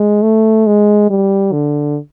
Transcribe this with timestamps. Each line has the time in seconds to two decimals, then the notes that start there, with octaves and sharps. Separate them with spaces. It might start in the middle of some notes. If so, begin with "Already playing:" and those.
Already playing: G#3
0.23 A3
0.67 G#3
1.10 G3
1.52 D3